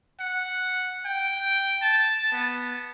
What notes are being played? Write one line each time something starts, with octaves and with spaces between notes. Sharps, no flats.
F#5
G5
A5
B3